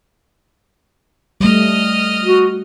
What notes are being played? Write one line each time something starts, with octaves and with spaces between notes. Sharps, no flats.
G3 A3 D#5 F6
F#4